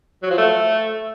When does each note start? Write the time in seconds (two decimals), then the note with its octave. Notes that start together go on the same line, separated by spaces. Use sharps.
0.23 F#3
0.30 F3
0.38 A3